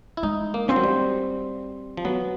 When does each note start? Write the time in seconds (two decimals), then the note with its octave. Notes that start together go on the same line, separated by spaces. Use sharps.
0.17 E4
0.23 G#3 D#4
0.54 A#3
0.68 F3 C4
0.76 F#3
0.84 G3
1.97 F3
2.04 F#3 B3